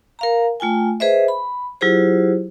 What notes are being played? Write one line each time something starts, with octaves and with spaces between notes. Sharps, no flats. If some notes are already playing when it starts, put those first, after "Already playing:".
A#4 F5 A#5
A3 F4 G5 G#5
G#4 B4 C5 D#5 E5
B5
F#3 E4 F4 G4 G#4 C5